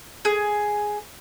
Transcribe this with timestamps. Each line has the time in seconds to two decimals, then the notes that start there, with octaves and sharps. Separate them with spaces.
0.25 G#4